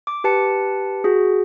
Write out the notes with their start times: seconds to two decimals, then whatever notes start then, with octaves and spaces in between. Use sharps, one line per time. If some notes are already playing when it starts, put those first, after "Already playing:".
0.07 D6
0.24 G4 B4 A5 C#7
1.04 F#4 G#4